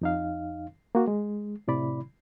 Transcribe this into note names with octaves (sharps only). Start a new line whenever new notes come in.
F2 D#4 F5
A#3 F#4
G#3
A2 C3 E4 D5 B5